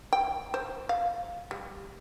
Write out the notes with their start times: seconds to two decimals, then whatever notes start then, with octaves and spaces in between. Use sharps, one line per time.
0.13 G5
0.54 C5
0.89 F5
1.51 G3